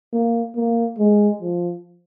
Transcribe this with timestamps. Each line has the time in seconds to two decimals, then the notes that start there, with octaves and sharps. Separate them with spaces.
0.13 A#3
0.56 A#3
0.99 G#3
1.41 F3